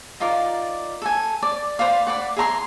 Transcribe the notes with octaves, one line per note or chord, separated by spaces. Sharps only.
D#4 F4 A#4 D5
A4 G#5
D5
B4 C5 D5 F5
B4 D5 F#5
G#4 E5 A#5 C6